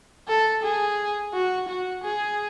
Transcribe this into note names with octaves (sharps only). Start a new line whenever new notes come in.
A4
G#4
F#4
F#4
G#4